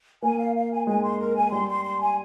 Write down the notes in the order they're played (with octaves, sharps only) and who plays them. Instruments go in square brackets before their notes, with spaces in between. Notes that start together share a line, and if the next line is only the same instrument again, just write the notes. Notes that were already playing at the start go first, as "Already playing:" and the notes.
[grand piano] A#3 [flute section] G#5
[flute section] F5
F5
G#5
[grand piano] G#3 [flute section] G#5
[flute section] C6
A#4
G#5
[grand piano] G3 [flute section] C6
[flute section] C6
C6
G#5